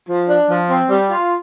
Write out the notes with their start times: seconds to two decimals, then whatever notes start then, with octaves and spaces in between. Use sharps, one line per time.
0.08 F3
0.29 D4
0.50 F3
0.70 C4
0.89 G3
1.10 F4